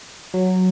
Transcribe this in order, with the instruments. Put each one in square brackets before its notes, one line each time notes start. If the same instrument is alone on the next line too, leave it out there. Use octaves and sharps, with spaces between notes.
[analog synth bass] F#3